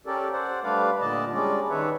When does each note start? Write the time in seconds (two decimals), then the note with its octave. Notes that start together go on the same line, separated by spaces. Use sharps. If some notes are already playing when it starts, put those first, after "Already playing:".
0.06 C#4 G4 A4 A#4 D5
0.32 C5 D5 F#5
0.64 G3 A3 D4 B4 D5 F5
1.00 A#2 D3 D5 D#5 A5
1.32 G3 G#3 C#4 D4 D5
1.70 D#3 B4 C#5 E5